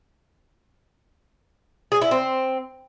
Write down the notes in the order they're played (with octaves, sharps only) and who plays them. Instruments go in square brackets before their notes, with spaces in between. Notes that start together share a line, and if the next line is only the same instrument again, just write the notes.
[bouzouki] G#4
E4
C4